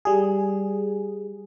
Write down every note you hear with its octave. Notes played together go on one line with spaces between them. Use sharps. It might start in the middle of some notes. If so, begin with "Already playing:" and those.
G3 G#4